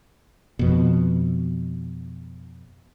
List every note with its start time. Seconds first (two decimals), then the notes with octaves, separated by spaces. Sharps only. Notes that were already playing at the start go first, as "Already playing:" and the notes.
0.59 F2 B2